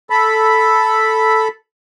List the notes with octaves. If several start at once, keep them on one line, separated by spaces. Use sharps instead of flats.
A4 B5